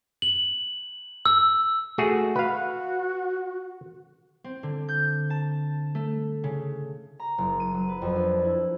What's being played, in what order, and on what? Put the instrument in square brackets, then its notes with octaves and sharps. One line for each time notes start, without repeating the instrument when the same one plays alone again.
[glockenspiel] F#7
E6
[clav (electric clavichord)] A3 F#4 G#4
[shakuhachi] F#4 [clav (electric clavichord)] B4 F5
[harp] C4
D3
G6
A5
A3
C#3
A#5
F#1
D#7
F#3
B4
F2
D4
E4